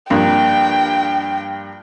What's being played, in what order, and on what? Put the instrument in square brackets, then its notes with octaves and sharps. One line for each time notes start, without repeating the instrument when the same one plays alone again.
[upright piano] G2 F3 A#3 [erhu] G5